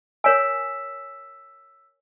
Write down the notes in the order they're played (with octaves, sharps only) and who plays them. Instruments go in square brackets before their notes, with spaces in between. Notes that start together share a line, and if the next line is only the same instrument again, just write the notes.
[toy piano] A#4 C#5 G#5 [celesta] E6 B6 E7